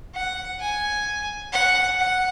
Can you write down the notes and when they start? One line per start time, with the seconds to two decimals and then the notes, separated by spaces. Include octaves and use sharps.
0.15 F#5
0.61 G#5
1.53 F#5
1.98 F#5